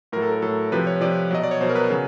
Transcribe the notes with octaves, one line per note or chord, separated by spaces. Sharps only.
A2 F#3 A#4
A4
A#4
A2 F#3 A4
C3 F3 B4
C#5
C3 F3 D5
B2 F#3 D#5
D5
C#5
B2 F#3 C5
A#4
B4
C#3 F#3